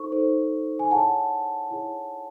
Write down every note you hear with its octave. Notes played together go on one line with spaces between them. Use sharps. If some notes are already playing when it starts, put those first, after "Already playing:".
Already playing: D#4 A4 C5 C#6
D#4 A4 C5
G#5
E4 G#4 C#5 F#5 A5
E4 G#4 C#5